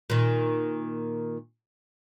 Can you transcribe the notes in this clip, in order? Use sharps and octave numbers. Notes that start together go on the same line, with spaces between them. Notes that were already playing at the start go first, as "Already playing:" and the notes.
A#2 D#3